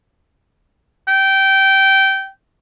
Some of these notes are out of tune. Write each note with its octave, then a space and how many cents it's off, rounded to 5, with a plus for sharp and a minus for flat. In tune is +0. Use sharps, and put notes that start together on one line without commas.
G5 -15